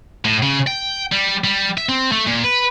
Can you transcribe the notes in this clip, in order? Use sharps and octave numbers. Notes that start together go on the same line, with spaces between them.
A2
C#3
G5
G3
G3
E5
C4
A3
A#2
B4